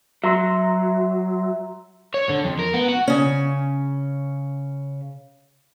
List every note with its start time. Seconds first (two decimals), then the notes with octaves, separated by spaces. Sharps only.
0.24 F#3 E5 A#5 C6
2.14 C#5
2.30 D3
2.45 F2
2.59 A#4
2.74 B3
2.88 F#4
3.08 C#3 C#4